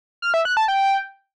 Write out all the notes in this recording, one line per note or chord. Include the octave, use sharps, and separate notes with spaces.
F6
E5
F#6
A5
G5